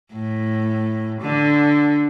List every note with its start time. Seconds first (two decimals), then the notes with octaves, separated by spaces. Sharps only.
0.12 A2
1.21 D3